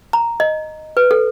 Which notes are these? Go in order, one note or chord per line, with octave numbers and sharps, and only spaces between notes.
A#5
D#5
B4
A4